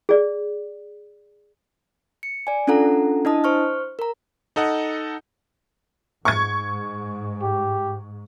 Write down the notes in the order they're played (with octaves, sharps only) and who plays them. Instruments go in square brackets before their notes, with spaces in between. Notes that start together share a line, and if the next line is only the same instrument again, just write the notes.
[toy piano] G#4 D5
[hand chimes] C#7
D5 G#5
C#4 D4 F4 A4 F#5 A#5
D4 E4 D#5 A5 D#6
C5 C#6 F6
A#4 A#5
[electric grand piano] D#4 A4 D#5 F#5
[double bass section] G#2 [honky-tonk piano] C#6 G#6
[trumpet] G4